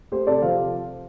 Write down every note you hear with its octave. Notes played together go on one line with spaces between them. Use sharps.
A3 G4 C5
C3 A4 D5
F3 C5 F5